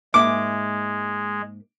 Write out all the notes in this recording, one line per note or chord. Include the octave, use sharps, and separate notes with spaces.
G#2 G#3 A#3 E5 D6